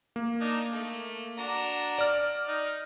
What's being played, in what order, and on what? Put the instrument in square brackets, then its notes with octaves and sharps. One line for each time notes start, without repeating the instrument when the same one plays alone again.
[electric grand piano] A#3
[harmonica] D4 D#4
A3
D4 F#4 A#5
[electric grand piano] D5 F6
[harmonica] D#4